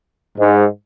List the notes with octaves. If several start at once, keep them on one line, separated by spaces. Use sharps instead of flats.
G#2